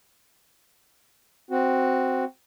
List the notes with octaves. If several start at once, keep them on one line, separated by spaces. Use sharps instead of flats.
C4 F#4